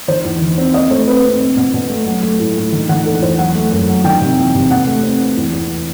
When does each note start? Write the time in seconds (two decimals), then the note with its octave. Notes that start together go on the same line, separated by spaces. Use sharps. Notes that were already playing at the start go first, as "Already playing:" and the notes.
0.08 D#3 C5
0.25 E2
0.42 D#3
0.58 C4
0.74 C4 D#5
0.91 A3 C5
1.07 C4 B4
1.24 C4
1.41 C4
1.57 B2
1.74 B2
1.90 A3
2.06 F#3
2.23 A3
2.40 A2
2.56 A2
2.72 D#3
2.89 D#3 F#5
3.05 E2 A4
3.22 E2 C5
3.38 F#3 F#5
3.55 A3
3.71 F#2
3.88 F#3
4.04 D#3 G5
4.21 C3
4.37 E2
4.55 C3
4.71 B2 F#5
4.87 A3
5.03 C4
5.20 C4
5.37 E2
5.54 E2